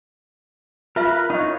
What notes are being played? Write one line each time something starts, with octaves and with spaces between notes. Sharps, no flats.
F4 A#4 B4 E5 F5
D#4 F4 C#5 F#5